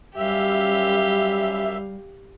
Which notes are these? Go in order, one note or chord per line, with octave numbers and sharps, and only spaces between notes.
F#2 G3 G4 E5 F5